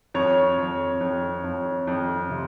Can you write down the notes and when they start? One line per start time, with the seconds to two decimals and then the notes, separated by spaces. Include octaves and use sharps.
0.14 F2 C#5
0.58 F2
1.01 F2
1.44 F2
1.87 F2
2.30 C3